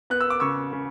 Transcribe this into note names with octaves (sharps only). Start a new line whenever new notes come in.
B3 F#6
E6
D6
C#3 C#6 E6
C#3